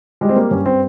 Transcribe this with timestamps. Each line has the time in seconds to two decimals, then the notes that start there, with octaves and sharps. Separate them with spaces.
0.21 G3 G#3
0.29 C4
0.36 A#3
0.51 G2 C#4
0.66 C4